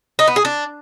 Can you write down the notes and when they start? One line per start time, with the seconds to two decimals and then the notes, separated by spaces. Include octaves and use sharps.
0.19 D#4
0.27 B3
0.36 G#4
0.45 D4